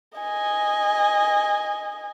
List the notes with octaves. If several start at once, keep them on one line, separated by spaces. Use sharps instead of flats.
D#5 G#5